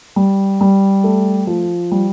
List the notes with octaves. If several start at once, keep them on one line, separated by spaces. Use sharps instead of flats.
G3
G3
A3
F3
G3